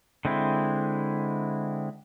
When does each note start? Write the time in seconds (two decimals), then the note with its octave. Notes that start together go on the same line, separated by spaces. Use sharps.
0.25 D3 G#3 C4 E4